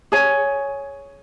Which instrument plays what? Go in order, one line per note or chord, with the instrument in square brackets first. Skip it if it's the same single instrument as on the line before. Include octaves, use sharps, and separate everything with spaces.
[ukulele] G#4 C#5 G#5